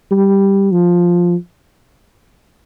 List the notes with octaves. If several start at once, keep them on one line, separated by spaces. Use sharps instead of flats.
G3
F3